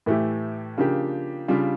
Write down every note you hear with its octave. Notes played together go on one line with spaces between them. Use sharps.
A2 E3 A3 E4 G4
C#3 F3 A#3 D4 G4
C#3 G3 D4 F4